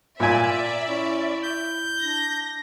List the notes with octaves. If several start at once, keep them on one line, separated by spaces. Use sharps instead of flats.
A#2 D5 E5 G#5
C#4 E4
G6
D4 A#6